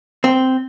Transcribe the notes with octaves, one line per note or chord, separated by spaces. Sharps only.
C4